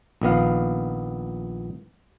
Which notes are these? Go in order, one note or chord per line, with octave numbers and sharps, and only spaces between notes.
A#1 D#3 B3 F5